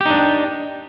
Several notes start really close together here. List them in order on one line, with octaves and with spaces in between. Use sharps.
G4 D#4 D4